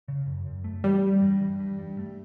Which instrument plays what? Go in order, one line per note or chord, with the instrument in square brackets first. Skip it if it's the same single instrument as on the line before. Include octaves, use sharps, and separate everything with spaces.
[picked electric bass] C#3
F#2
F#2
A3
[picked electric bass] E3 [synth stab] G3
[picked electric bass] G2
G2
E3
G2
G2
A3